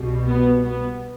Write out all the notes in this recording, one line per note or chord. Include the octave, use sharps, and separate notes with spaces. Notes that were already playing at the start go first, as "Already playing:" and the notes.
Already playing: C2 B2 G3
B3
B3